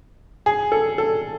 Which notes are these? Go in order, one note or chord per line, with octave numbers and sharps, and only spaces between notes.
G#4
A4
A4